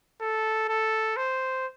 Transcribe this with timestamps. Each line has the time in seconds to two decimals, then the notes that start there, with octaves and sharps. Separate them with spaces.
0.21 A4
0.68 A4
1.16 C5